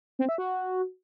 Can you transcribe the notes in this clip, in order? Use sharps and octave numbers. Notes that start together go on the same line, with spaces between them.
C4
E5
F#4